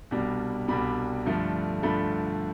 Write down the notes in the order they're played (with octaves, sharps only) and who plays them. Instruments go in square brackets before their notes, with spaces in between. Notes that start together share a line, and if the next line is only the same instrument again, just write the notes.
[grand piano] C2 B2 G3 D4
C2 B2 G3 D4 B5
G2 D3 F3 A3
G2 D3 F3 A3 B5